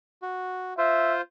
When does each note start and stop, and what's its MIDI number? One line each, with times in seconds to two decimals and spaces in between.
0.22 0.74 66
0.78 1.21 65
0.78 1.21 72
0.78 1.15 76